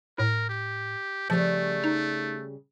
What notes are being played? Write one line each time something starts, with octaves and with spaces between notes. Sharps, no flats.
A2 A#4
G4
C#3 F3 G3 A3
D#4